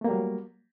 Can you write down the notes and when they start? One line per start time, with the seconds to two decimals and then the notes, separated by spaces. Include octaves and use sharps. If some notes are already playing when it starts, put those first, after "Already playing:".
0.01 A3
0.04 A#3
0.08 G3
0.11 F#3